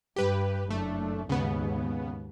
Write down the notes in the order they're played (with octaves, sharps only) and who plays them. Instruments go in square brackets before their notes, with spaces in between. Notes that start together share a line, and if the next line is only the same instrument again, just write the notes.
[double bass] G2 [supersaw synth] G4 B4
[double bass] F#1 D4 [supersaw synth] A3
[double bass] D#2 G#2 [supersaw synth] C#3 B3